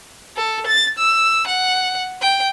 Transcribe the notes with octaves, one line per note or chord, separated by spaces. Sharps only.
A4
A6
E6
F#5
G5